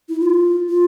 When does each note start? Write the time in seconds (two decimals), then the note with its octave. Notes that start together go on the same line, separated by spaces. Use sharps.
0.09 E4
0.20 F4
0.69 F4